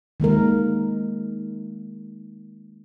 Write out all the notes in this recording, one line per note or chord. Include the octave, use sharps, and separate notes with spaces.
D#3 G#3 A#3 A#4